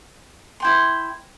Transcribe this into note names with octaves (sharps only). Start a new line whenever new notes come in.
E4 G5 C6